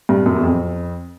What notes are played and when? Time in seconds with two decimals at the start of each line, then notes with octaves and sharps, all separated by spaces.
0.09 G2
0.26 F#2
0.36 E2
0.43 F2